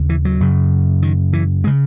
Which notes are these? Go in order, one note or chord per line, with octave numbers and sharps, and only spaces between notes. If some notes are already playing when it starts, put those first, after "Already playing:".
Already playing: D#2 C#3
E3
F#3
F#2 C#3
D#3
E3
G#3
C#3